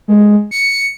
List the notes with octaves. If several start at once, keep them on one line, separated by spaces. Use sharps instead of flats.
G#3
C#7